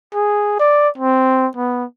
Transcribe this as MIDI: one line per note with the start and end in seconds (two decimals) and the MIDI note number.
0.14 0.58 68
0.59 0.88 74
0.98 1.48 60
1.56 1.84 59